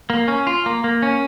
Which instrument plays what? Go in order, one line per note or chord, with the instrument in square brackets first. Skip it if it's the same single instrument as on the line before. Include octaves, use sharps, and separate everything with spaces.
[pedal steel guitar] A#3
C#4
F4
A#3
A#3
C#4